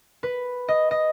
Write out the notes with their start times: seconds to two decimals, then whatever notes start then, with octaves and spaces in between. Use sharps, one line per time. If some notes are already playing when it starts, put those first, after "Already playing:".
0.23 B4
0.68 D#5
0.91 D#5